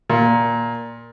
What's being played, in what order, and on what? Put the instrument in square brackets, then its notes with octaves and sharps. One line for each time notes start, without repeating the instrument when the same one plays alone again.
[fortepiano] A#2